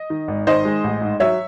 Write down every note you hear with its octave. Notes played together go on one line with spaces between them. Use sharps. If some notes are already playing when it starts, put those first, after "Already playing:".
Already playing: D#5
D#3
G#1
D#3 C5 D#5
G#3
A1
G#2
F#3 C#5 E5